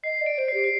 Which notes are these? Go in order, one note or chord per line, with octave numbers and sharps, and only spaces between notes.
D#5 C7
D5
D7
C5 D7
C7
G4
C7